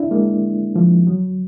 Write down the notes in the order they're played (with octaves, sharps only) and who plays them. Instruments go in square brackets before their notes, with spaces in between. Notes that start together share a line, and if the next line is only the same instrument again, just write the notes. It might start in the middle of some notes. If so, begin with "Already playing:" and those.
Already playing: [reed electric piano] D4 E4
G#3 A#3
F3
F#3